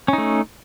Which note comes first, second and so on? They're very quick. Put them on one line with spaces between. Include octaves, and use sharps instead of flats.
C#4 D#4 A3